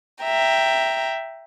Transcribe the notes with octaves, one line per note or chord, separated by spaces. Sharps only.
E5 G5 A#5